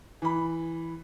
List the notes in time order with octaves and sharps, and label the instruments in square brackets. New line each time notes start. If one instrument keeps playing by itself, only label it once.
[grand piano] E3 B5